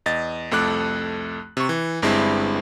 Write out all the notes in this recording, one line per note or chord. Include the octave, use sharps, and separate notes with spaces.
E2 D#5 A6
C2 F2 A3 D6 F#6
C3 C#6
E3
G1 G2 G#3 C4 E4